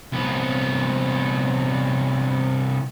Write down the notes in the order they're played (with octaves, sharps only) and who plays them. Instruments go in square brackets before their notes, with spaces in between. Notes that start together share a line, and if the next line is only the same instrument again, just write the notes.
[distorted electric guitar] C2 B3